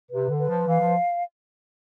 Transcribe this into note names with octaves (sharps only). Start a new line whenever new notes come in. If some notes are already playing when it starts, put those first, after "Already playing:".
C3 B4
D3
B4
F3
E3 F5
F3